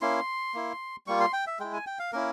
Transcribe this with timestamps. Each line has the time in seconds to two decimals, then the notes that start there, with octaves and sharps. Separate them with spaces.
0.01 A#3 C#4 E4 C6
0.54 A#3 E4
1.07 G3 A#3 F4 C#6
1.20 C6
1.33 G5
1.47 E5
1.59 G#3 E4 G5
1.73 G#5
1.87 G5
1.99 F5
2.13 A#3 C#4 E4 A#4